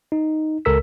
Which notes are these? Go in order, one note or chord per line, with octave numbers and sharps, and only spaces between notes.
D#4
C#2 A4 A#4 E6 B6